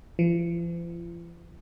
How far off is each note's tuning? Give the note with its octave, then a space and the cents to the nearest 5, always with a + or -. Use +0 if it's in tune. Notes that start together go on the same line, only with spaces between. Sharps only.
F3 -45